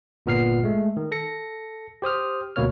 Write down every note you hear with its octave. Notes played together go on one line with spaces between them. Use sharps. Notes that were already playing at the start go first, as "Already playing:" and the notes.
G1 A#2 B3 F6 C7
G#3 A3
D#3
A4 A#6 C#7
G4 C5 D#6 F6
D2 B2 A#3 C#5 F6